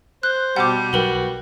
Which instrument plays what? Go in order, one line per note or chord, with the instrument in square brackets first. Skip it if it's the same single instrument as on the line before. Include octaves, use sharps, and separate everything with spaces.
[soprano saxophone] C5 [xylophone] F#6
[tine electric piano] B2 G5 A5 [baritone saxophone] G3 [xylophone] F#5 D6
[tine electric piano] B1 B4 G5 [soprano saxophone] F#4 [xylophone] A#4 F#7 G7